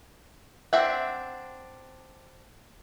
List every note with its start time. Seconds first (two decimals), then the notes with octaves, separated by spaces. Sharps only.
0.73 C4 D4 E5 F#5